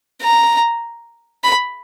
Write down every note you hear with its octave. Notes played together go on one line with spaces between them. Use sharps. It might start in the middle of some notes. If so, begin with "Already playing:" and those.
A#5
B5